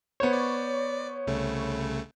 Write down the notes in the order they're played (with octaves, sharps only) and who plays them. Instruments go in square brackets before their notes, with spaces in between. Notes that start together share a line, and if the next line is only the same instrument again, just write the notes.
[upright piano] B3 C5 [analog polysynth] C#5
[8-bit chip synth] D5
C2 C#3 A3